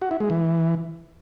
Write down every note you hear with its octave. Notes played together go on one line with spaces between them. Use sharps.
F#4
E4
G#3
E3